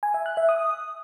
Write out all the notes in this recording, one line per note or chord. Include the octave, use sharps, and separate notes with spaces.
G#5
E5
F#6
E5
D#6